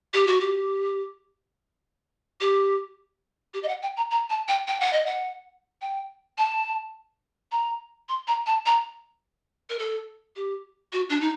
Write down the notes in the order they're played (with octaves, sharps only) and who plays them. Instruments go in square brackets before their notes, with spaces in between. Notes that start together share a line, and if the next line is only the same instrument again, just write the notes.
[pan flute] G4
F#4
G4
G4
G4
D#5
F#5
G5
A#5
A#5
A5
G5
G5
F#5
D#5
F#5
G5
A5
A#5
C6
A#5
A5
A#5
A#4
A4
G4
F#4
D4
D#4